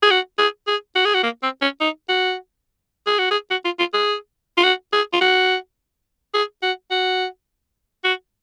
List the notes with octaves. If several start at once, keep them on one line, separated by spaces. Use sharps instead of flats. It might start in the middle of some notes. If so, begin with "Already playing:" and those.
G#4
F#4
G#4
G#4
F#4
G#4
F#4
A#3
C4
C#4
D#4
F#4
G#4
F#4
G#4
F#4
F4
F4
G#4
F4
F#4
G#4
F4
F#4
G#4
F#4
F#4
F#4